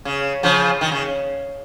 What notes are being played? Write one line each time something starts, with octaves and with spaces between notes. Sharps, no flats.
C#3
C#3 F3
D#3
C#3